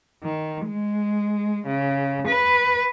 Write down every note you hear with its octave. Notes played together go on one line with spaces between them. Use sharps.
D#3
G#3
C#3
B4